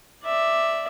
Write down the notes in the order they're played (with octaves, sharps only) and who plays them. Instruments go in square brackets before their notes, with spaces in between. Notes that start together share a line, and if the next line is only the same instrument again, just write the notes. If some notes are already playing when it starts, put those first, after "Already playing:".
[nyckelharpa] D5 E5